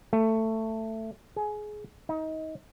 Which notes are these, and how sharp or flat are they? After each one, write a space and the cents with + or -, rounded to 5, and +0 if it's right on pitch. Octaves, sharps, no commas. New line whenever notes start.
A3 +15
G#4 +20
D#4 +25